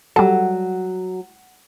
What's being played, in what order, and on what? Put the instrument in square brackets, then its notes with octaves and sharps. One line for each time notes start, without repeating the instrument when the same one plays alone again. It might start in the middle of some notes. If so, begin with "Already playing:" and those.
[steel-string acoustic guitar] F#3 [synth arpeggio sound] G3 A4